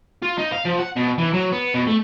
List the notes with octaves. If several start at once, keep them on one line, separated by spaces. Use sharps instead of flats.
F4
D#4
F5
F3
F#5
B2
E3
F#3
B3
B2
A3